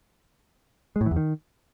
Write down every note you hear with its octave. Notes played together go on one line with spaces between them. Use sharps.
G#3
A2
E3
E2
D#3